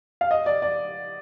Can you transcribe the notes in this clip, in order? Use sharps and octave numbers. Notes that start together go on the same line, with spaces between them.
F5
D#5
D5
D5